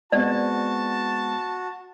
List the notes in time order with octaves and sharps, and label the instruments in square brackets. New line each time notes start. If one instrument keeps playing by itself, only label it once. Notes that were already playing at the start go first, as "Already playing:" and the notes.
[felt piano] G#3 B3 C4 [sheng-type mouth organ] F#4 [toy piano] D5 [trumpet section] A5